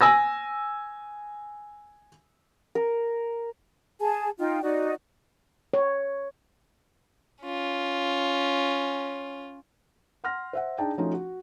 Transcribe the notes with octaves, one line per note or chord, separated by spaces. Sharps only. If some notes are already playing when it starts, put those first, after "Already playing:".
G#5 E6 A#6
A#4
G#4 G#5 A5
D#4 F4 G5
D#4 F#4 D5
C#5
C#4 F4
F#5 C6 F6 A#6
C5 E5 F#5
D4 D#4 G#4 G5 A5
F3 A3 C#4 D#4 F4 F#4
F#4